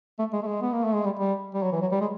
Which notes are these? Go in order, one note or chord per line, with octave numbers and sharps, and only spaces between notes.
A3
G#3
A3
G#3
B3
A#3
A3
G#3
G3
G3
G3
F#3
E3
F#3
G3
G#3